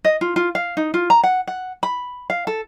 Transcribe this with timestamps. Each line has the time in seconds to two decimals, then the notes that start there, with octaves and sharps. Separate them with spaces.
0.05 D#5
0.21 F4
0.36 F4
0.55 F5
0.77 D#4
0.94 F4
1.10 A#5
1.23 F#5
1.47 F#5
1.83 B5
2.30 F5
2.47 A4